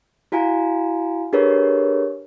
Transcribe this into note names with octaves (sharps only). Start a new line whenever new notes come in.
E4 F#4 F5 G#5 A#5
D4 G4 G#4 A#4 B4 C#5